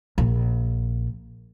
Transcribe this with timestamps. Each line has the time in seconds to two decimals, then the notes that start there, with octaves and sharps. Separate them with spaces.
0.18 A#1